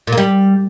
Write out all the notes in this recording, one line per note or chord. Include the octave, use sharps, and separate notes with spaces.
A#2
A#3
G3